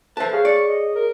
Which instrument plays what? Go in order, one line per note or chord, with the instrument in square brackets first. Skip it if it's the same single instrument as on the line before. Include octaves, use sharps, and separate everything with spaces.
[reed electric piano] A4 E5 [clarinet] B4 [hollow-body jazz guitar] C5 A5
[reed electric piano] G#4 C#5 [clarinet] F5
[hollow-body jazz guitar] D5 [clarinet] C#6
[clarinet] D#5
A#4